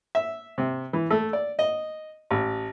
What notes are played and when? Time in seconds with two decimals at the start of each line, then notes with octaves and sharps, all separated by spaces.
0.15 E5
0.58 C3
0.93 E3
1.11 A3
1.33 D5
1.59 D#5
2.31 A1